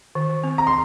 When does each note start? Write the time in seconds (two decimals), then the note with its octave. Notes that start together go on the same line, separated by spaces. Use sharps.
0.15 D#3
0.44 C4
0.58 A#5
0.67 C6